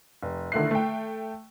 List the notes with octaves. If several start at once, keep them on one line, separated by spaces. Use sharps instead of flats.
F1
D3 D#3 A3 E4 F#6 C7
A3 G5